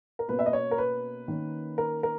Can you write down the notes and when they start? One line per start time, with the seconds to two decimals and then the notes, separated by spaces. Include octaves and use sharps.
0.19 A#4
0.28 B2 A#3 C#4 B4
0.39 E5
0.46 D#5
0.53 C#5
0.71 A#4
0.78 B4
1.28 D#3 A#3 C#4
1.78 A#4
2.03 A#4